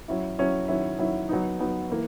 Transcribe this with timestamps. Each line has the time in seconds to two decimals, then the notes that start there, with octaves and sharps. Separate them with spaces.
0.08 F#3 C#4 E4
0.38 F#3 C#4 E4
0.68 D#3 F#3 C#4 E4
0.99 D#3 F#3 C#4 E4
1.29 F#3 B3 D#4
1.59 F#3 B3 D#4
1.90 E3 A#3